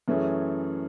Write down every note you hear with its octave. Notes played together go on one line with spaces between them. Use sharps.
F#2 E3 A3 C#4 G#4